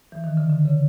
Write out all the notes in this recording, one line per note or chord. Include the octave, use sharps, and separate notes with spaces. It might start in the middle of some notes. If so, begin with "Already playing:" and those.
E3
D#3
D3
D3
C#3